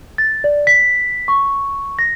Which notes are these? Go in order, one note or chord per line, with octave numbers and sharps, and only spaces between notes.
A6
D5
B6
C#6
A#6